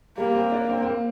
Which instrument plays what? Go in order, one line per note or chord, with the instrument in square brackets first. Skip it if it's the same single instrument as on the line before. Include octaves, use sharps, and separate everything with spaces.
[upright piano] G3 [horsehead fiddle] A#3
[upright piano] C4
D4
C4
C4
A#3